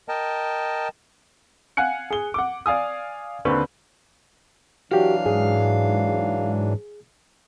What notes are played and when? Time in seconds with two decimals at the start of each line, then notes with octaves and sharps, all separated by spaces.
0.09 A#4 D#5 G5 A5
1.77 F5 F#5 G#5 F#6 C#7
2.11 G#4 G7
2.34 F#5 D6
2.66 D5 F5 G#5 D#6
3.45 D#2 D3 C4 B4 B5 C#6
4.92 E3 F#3 D4 F#4 G4 F5
5.26 G#2 G#4